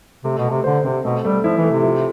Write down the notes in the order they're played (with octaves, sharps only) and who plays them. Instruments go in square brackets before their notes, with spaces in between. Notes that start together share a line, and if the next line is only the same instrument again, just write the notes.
[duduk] C3 [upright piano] A3
[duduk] B2
[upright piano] A3
[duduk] C3
[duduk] D3 [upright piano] C5
[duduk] C3 [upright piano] C4
[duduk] B2 [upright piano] A3
[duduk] G3 [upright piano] A3
[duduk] F3 [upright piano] E4
[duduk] E3
[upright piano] A3
[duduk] C3
[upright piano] F3